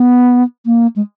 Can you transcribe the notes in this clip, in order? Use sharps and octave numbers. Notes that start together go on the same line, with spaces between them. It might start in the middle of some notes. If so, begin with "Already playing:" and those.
Already playing: B3
A#3
G#3